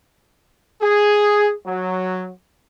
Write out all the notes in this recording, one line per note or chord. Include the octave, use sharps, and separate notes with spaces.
G#4
F#3